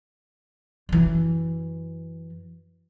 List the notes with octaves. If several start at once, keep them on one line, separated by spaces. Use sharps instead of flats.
F#2 E3